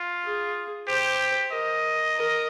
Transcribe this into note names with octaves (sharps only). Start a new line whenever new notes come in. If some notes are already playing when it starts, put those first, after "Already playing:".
Already playing: F4
G#4
G4 C5
A#4 D#5
A#4